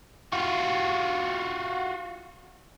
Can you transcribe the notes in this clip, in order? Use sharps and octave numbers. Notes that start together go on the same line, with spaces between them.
F4 F#4